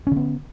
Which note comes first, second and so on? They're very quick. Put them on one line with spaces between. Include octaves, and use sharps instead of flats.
C#4 D3 B3